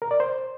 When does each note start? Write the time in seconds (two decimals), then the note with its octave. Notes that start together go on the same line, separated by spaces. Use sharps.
0.02 A#4
0.11 D5
0.20 C5